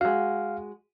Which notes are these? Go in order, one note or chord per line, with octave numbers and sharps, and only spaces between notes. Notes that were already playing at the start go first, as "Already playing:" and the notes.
G#3 F#4 F5